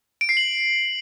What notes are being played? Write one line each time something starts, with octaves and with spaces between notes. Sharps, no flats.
D7
C7
F#7